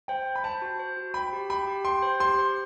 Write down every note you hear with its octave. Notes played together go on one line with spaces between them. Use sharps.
C5 G5
C5
B5
C5 A5
F#4
C5
F#4
G5 B5
G4
G5 B5
G4
G5 C6
C5
G4 C6
C5